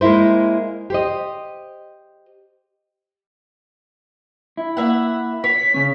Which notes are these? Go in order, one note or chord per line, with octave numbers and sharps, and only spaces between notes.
G#3 A#3 D#4 E4 C5
G4 C5 D#5
E4
A#3 E5 F#5
C#5 B6
C#3 C#4